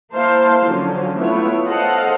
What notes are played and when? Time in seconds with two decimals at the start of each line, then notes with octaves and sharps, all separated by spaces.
0.14 A#3 E4 C5 F5 A5 C6
0.66 D3 F3 F#3 C#4
1.16 A3 B3 E4 F4 C#5
1.67 A4 C5 D#5 F5 F#5